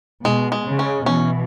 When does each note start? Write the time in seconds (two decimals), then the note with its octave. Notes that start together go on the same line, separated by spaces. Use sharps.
0.25 B2 G#3
0.52 G#3
0.65 C#3
0.79 C#4
1.06 B2 E3 C#4